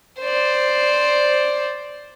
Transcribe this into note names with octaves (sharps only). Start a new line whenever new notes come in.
C5 D5